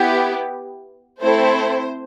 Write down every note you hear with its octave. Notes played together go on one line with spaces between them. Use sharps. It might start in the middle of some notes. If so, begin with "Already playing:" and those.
Already playing: B3 E4 G4
A3 C4 E4 A4 C5